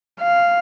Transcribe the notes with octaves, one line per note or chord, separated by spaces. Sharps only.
F5